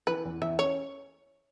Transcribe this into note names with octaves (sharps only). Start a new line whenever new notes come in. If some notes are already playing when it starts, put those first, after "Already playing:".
E3 B4
E2
E2 E5
C#4 C#5